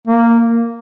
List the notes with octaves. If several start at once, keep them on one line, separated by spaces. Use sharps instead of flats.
A#3